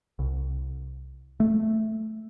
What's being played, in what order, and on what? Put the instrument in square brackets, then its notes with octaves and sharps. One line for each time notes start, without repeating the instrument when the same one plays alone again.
[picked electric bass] C2
A3